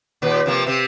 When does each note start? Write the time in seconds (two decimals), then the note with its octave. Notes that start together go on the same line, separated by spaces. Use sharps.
0.22 D#2 A#2 B4
0.46 C3 F3 A#3
0.66 C3 C4